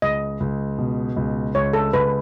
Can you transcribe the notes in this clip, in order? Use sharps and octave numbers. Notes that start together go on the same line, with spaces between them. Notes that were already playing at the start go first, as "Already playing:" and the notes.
C#2 D#5
C#2
B2
C#2
C#2 C#5
A4
C#2 B4